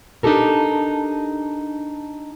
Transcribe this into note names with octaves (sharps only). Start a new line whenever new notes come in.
D4 D#4 F#4 G4 A4 A#4